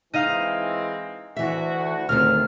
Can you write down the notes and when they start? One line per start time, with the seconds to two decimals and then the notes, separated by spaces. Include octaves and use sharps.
0.13 E3 G#3 C4 D#4 D#5 F5
1.37 D2 E3 F#4 E5
2.09 D2 C3 D#3 C#4 F4 F6